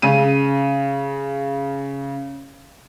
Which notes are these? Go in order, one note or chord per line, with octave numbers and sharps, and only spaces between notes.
C#3 D#7